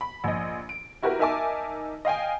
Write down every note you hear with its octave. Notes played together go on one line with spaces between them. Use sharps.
B5
A#1 D#5
D7
E4 F#4 G4 A#4 B4
D#4 A#4 E5 G#5 A5 D6
D#5 F5 G5 G#5